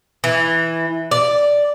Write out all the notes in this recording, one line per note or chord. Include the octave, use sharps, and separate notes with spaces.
E3
D5